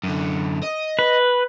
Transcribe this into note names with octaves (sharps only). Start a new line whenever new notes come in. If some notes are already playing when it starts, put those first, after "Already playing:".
F#2 D3
D#5
B4